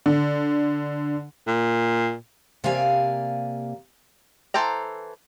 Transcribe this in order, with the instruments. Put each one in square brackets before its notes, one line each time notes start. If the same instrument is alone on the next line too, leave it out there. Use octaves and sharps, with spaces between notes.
[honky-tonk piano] D3
[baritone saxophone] A#2
[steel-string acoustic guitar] C3 A#3 G4 D5 F5 G#5
[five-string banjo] E3 A4 C5 G5 A#5